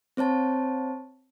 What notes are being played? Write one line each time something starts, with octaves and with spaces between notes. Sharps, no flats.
C4 C5 C#5 A5